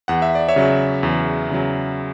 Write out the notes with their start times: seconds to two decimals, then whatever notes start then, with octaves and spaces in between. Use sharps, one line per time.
0.08 E2 F#5
0.22 E5
0.35 D5
0.49 C#5 E5
0.56 C#3 F#3
1.03 E2
1.50 C#3 F#3